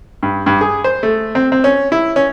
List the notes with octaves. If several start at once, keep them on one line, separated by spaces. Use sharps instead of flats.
G2
G2
G#4
C5
A3
C4
C4
C#4
E4
C#4